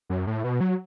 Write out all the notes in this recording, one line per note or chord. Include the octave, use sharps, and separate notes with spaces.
F#2
A2
B2
F#3